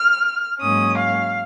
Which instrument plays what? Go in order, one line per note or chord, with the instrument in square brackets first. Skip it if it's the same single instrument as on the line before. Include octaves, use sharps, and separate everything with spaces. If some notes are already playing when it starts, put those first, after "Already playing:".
Already playing: [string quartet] F6
G#2 F#3 A#3 C#4 D#6
F5